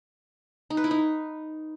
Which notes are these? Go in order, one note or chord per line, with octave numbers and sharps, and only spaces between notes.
D#4
B4
E4
D#4